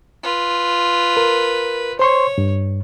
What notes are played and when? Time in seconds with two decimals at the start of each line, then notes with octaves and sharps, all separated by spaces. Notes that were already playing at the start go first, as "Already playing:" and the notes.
0.23 F4 B4
1.17 A#4
1.99 C5 C#5 C6 C#6
2.38 G2